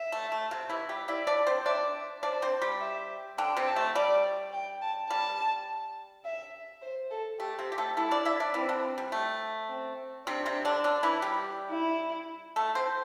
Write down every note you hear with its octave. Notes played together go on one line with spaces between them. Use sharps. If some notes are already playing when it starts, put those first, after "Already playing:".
Already playing: E5
A3
A3
C3 C4
E3 E4
G3 G4
E4 D5 E5
D4 D5
C4 C5
D4 D5 E5
D4 C5 D5
C4 C5
G3 G4
E5
D3 D4 G5
C3 C4
A5
A3
G3 D5
G5
A5
G3 A5
E5
C5
A4
A3 G4
C3 C4
G4
A3 A4
A3 E4 A4
D4 D5
E4 E5
D4 D5
E3 C4 E4
D3 D4
G3
A3
C4
C3 C4 D4
C3 C4
D3 D4
D3 D4
E3 E4
G3 G4
E4
A3 A4
C4 C5